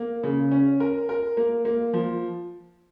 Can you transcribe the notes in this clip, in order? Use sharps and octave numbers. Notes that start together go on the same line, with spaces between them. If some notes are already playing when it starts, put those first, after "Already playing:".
Already playing: A#3
C#3
C#4
A#4
A#4
A#3
A#3
F3